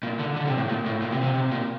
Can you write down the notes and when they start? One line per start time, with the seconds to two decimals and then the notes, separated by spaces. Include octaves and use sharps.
0.03 A#2
0.19 D3
0.36 D3
0.47 C3
0.58 A2
0.69 A#2
0.86 A2
1.02 A#2
1.12 C3
1.23 C3
1.35 C3
1.51 A#2